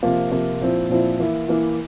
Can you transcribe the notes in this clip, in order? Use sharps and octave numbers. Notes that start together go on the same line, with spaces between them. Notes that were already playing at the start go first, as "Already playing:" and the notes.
C3 F3 A#3 F4
C3 F3 A#3 F4
A#2 F3 C4 E4
A#2 F3 C4 E4
E3 A#3 E4
E3 A#3 E4